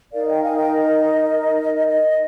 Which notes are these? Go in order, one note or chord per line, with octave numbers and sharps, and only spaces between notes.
D#4 A#4 D5 F5
D#5 G5
F5 G#5
D#5 G5
D#5
D#5